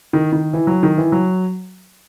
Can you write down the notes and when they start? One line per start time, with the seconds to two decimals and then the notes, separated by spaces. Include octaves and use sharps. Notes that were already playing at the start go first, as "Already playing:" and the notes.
0.13 D#3
0.33 D#3
0.53 E3
0.67 F#3
0.83 D#3
0.98 E3
1.12 F#3